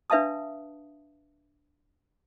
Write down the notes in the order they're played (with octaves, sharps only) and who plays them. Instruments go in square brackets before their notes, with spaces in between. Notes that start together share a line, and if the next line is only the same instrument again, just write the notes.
[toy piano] D4 B4 E5 F5 A5 D#6